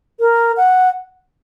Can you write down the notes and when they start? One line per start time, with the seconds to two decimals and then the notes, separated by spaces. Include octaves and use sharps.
0.20 A#4
0.57 F#5